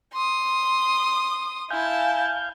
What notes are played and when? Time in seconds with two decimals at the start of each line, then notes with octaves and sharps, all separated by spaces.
0.13 C6 D#6
1.71 E4 F5 G#5 A5 G6